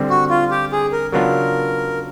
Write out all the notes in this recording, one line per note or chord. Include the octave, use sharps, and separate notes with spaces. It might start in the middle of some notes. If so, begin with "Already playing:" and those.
Already playing: D3 G3 C4
F#4
F4
G4
G#4
A#4
C#3 F#3 B3 D4 F4 A#4